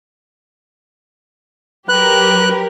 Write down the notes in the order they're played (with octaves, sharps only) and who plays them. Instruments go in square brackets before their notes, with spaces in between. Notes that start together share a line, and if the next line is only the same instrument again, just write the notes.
[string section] F#3 G4 A#4 [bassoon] B4 [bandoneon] F#6